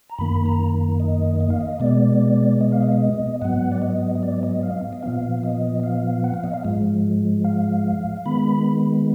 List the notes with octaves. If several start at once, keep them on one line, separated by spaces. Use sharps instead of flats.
A#5
F#2 D#3 A#3 B5
A#5
D#5
D#5
F5
D#5
B2 G#3 B3 D5
D#5
F5
D#5
G#2 F#3 B3 F#5
D5
D#5
D#5
D5
D#5
F5
D#5
A#2 F3 B3 F5
D#5
F5
F#5
F5
D#5
F5
G#2 F3 G#3
F5
D#3 G#3 B3 B5